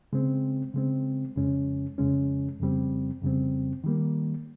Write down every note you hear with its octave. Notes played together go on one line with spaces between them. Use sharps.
C#3 G#3 C4
C#3 G#3 C4
F2 C#3 G#3 C#4
F2 C#3 G#3 C#4
F2 C#3 G3 C4
F2 C#3 G3 C4
D#3 G3 A#3